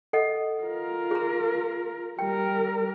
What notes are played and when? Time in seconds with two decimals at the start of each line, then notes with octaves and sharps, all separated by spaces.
0.13 A4 D#5 F#5
0.63 F4 A#4
1.11 G#4 A#5
2.19 G3 A#4 G5